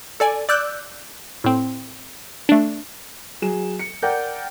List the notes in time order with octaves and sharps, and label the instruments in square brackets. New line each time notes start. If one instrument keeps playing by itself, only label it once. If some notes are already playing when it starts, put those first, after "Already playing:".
[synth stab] A4 D5 G#5
D5 D6 E6 F#6 G6
A2 C4
A3 D4
[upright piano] F#3 G#4 E7
C#7
A#4 D5 F#5 G5 G6